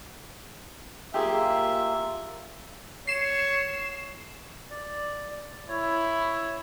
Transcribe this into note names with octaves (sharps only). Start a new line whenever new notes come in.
A#3 F4 G4 G#4 E5
C#5 C7 E7
D5
E4 C#5